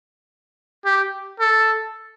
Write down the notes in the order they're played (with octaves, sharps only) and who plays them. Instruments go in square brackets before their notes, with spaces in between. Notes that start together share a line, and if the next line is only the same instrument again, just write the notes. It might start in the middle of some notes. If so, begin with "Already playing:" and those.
[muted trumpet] G4
A4